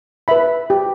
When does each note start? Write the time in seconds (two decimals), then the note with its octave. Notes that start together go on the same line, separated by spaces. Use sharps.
0.28 B4 E5 B5
0.70 G4